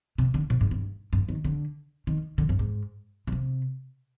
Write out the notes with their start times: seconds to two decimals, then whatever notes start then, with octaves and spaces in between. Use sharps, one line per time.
0.18 C3
0.34 D3
0.50 A#2
0.61 G#2
0.71 G2
1.13 G2
1.29 D#3
1.44 D3
2.07 D#3
2.38 D3
2.49 G2
2.59 G#2
3.27 D3
3.32 C3